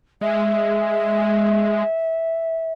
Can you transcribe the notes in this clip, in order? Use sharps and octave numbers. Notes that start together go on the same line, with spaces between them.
G#3 E5